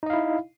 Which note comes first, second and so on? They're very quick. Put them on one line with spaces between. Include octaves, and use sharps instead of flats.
D#4 D#5 F5 E4